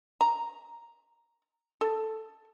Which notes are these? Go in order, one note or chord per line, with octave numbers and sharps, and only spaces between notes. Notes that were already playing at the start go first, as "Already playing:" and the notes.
A#5
A4